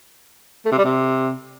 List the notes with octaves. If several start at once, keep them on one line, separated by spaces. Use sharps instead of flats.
A3
C3
G3
C3